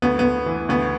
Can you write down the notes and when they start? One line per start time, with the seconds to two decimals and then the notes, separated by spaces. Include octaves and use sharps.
0.02 D2 B3
0.19 B3
0.25 D2
0.46 E3
0.69 D2 B3